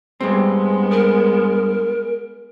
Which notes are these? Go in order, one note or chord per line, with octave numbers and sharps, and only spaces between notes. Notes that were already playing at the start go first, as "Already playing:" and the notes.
G2 G#3 B3 C4
A#4